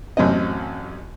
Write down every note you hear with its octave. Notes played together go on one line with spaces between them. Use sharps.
A1 F#2 C4 C#4 D#5